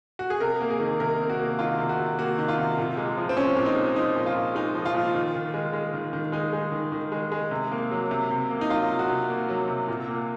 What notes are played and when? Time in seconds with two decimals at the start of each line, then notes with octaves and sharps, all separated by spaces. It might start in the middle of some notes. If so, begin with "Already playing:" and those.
0.19 F#4
0.30 G#4
0.40 C3 A#4
0.61 A#3
0.70 G#4
0.80 D#3
1.00 C3 A#4
1.20 C3
1.30 F#4
1.39 A#3
1.59 D#3 F4
1.78 C3
1.89 F#4
1.99 C3
2.18 A#3 F#4
2.39 D#3
2.48 F4
2.58 C3
2.78 A#2
2.97 G#3
3.17 F3
3.29 C4
3.37 A#2 C#4
3.57 A#2
3.66 D#4
3.76 G#3
3.96 F3 D#4
4.16 A#2
4.26 F4
4.35 A#2
4.55 G#3 D#4
4.75 F3
4.85 F4
4.94 A#2
5.14 D#3
5.34 D#3
5.54 G#3
5.73 G#3
5.94 D#3
6.13 D#3
6.32 G#3 D#4
6.53 G#3
6.72 D#3
6.92 D#3
7.12 G#3
7.32 G#3
7.51 C3
7.72 A#3
7.91 F#3
8.11 C3
8.30 C3
8.50 A#3
8.61 D#4
8.69 F#3 F4
8.89 C3
8.99 F#4
9.09 C3
9.29 A#3
9.49 F#3
9.68 C3
9.88 A#2
10.08 A#3